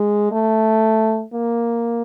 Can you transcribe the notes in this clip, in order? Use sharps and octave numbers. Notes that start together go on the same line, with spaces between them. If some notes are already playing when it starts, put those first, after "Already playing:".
Already playing: G#3
A3
A#3